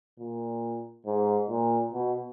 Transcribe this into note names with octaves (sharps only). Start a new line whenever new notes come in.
A#2
G#2
A#2
B2